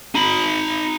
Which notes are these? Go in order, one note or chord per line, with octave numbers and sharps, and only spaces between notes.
D#4 B5